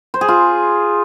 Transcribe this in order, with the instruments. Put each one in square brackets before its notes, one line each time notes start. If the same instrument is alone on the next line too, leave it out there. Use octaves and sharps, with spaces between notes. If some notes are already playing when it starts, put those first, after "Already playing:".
[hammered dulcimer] C5
G#4
F4